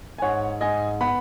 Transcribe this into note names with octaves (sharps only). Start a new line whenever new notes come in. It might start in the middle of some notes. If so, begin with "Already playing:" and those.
G#5
G#2 C#5 F#5
G#2 D#5 G#5
B3 F#5 B5